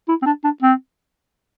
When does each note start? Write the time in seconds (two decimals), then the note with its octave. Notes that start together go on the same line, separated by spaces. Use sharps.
0.08 E4
0.22 C4
0.26 D4
0.44 D4
0.62 C4